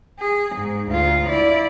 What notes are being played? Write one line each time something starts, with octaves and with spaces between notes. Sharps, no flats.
G#4
G#2
D2 F4
E4 D5